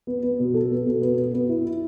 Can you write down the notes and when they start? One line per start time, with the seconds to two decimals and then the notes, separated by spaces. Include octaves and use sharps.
0.07 B3
0.23 B3
0.39 B2
0.54 A4
0.71 B3
0.86 B2
1.02 B3
1.17 B3
1.34 B3
1.49 E4
1.65 E4